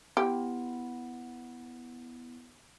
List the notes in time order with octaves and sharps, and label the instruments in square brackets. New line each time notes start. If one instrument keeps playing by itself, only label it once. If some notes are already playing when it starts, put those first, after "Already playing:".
[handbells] B3 E4 [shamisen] G4